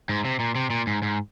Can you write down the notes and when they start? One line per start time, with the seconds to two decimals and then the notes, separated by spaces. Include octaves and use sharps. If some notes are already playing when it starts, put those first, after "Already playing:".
0.09 G#2
0.25 C3
0.40 A#2
0.55 C3
0.70 A#2
0.87 G#2
1.03 G#2